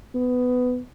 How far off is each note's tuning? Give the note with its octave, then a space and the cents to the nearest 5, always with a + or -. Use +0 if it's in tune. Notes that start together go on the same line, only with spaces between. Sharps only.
B3 +15